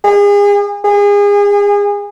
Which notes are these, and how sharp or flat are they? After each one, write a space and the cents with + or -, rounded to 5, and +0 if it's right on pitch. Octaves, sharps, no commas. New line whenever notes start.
G#4 -35
G#4 -30